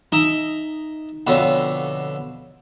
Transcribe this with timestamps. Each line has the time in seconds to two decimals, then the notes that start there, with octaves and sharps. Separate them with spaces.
0.12 D#4 D#5 E5 A#5
1.27 F2 B2 D3 C#5 F5 B5